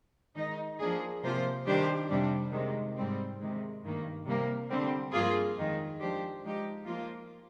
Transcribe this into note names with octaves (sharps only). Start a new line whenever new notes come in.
D#3 G#3 D#4
F3 A#3 D4 G#4
C3 F3 A#3 F4 C5
D#3 G3 D4 G4 C5
F2 C3 G3 D4
C3 D#3 G#3
G#2 G3 C4
C3 D#3 G#3
G2 D#3 A#3
C3 G3 A#3
D3 G3 C4
G2 F3 A#3 F4 G#4
F2 D#3 G#3
F3 G#3 D4 G4 C5
F3 G#3 D#4 G4
F3 A#3 F4